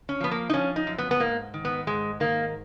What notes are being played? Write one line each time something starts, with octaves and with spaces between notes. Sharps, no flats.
C#4
F3 B3
A#3
D#4
F3 C#4
D#4
F#2
B3
B3
G#2 A#3
D#3
B3
G#2 G#3
D#3 A#3